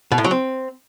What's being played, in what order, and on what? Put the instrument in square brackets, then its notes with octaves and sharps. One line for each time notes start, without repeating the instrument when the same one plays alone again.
[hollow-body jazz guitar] B2
A2
F#3
C4